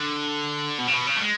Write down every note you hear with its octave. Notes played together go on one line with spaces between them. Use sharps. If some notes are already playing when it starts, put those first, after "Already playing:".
Already playing: D3
B2
C#3
B2
C#3
A3
G#3